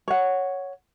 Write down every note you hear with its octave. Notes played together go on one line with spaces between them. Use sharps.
C#5 F#5